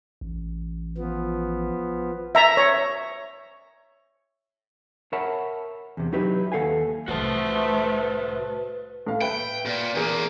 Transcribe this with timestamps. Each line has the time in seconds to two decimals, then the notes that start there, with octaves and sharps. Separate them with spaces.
0.21 A1
0.98 F3 B3
2.35 E5 A#5
2.57 C#5
5.12 A#4 C#5 E5 F#5 A5 B5
5.97 E2 C3
6.12 F#3 D#4 E4 G4 B4
6.52 D#2 A3 A4 F5 F#5 G#5
7.08 C2 A2 A3 F#4 B4 C5 A5
9.07 A2 F5
9.21 B4 E5 G5 B5
9.66 A#2
9.95 E2 A#3 G#4 A#4